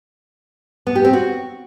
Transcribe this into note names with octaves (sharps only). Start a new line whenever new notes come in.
B3
G4
C4
F#4